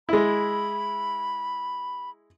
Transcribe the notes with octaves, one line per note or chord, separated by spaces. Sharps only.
G#3 E4 B5